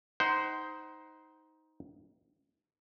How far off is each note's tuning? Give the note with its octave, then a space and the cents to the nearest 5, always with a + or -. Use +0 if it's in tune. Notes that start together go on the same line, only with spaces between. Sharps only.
D#4 +15 C5 -10 F#5 +35